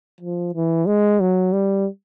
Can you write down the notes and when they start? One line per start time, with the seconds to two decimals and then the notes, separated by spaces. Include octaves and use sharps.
0.21 F3
0.54 E3
0.87 G#3
1.20 F#3
1.53 G3